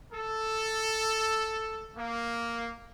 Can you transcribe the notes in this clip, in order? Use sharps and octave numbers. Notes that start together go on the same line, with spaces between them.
A4
A#3